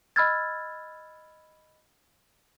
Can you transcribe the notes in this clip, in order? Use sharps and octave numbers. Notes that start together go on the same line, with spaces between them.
D#5 B5 E6 F6 G#6 A6